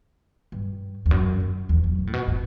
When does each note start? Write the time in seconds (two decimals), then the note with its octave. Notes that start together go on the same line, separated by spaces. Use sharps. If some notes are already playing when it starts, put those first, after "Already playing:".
0.52 G2
1.06 E2
1.11 F#2
1.40 F#2
1.69 E2
1.84 F#2
1.99 B2
2.07 A2
2.13 B2
2.28 A2